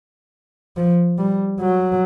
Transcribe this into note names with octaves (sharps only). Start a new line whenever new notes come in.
F3
G3
F#3